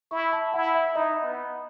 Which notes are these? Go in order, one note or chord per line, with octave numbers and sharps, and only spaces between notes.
E4 C#6
A5
E4 F#5
E5
D#4 D#5
B3